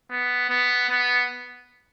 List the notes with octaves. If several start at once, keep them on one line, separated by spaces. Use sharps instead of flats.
B3
B3
B3